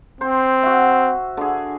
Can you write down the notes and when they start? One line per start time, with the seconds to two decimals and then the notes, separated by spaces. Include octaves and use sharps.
0.21 C4 C5
0.63 F#4 E5
1.37 D3 G#4